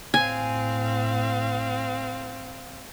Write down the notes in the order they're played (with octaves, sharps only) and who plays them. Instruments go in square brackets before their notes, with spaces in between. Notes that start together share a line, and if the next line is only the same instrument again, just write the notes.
[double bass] A2 [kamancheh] C4 F5 [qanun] G#5